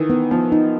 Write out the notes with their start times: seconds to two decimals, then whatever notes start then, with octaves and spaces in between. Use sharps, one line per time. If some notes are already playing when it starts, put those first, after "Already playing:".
Already playing: D#3 E3
0.10 B3
0.31 F3 B3
0.52 D#4